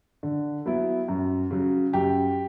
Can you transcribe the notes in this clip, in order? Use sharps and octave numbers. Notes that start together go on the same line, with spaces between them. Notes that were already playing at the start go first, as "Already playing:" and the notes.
D3
F#3 B3 E4
F#2
C#3 F#3
F#2 G4